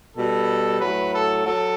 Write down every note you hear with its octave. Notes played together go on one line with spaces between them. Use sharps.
B2 G3 A4
A2 F#3 B4
A4
F#3 A4